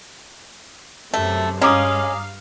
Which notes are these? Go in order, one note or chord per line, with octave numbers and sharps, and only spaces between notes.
F#2 C3 A3
G2 G#3 C#4 F5 A#5 D6 D#6